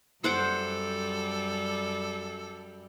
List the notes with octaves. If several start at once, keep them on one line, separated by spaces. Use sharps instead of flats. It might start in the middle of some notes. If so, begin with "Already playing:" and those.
F#2 G3 A4 C5 F#5 D6